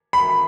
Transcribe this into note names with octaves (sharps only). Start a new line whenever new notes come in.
B5